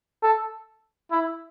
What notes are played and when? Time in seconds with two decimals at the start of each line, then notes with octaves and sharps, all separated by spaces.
0.23 A4
1.12 E4